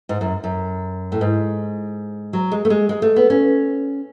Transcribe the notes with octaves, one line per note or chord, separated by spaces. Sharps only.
G#2
F#2
F#2
A2
G#2
F#3
G#3
A3
G#3
G#3
A3
B3
C#4